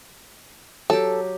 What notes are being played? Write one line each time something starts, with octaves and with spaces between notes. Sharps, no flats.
F#3 G4 A4